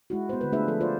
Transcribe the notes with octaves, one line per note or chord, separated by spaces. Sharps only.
G#3 E4 F#4
B3 C5
D3 G3 B4
A3 D4 F4 G#4 B4 E5
F3 A4
F4 C5 D5